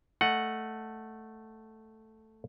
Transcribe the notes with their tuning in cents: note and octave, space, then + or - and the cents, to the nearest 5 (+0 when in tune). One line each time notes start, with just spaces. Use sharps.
A3 +0 D#5 +0 F#5 +0